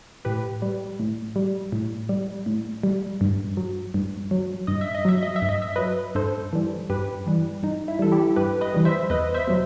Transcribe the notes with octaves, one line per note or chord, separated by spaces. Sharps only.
A2 G4 B4
G3
A2
G3
A2
G3
A2
G3
G2
F#3
G2
F#3
G2 D#5
E5
D#5
F#3 E5
D#5
E5
G2
D#5
E5
F#3 B4 D#5
G2 A4 C5
E3 G3
G2 G4 B4
E3 G3
G2 D#4
E4
E3 G3 A4
E4 G4
G2 G4 B4
B4 D#5
E3 G3
C5 E5
E2 B4 D#5
C5 E5
B2 F#3